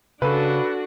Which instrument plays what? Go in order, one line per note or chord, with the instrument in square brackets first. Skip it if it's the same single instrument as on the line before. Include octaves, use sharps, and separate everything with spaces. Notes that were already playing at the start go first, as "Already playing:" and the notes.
[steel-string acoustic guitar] C#3 [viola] D4 F#4 [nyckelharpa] A4 [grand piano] B4